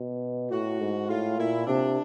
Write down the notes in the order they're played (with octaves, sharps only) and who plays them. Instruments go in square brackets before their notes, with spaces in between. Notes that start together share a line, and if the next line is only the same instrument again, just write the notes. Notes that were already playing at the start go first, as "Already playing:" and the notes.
Already playing: [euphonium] B2
[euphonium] A2 [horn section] F#4
[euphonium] G#2
[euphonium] A2 [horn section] F4
[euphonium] A#2 [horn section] E4
[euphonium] C3 [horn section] D4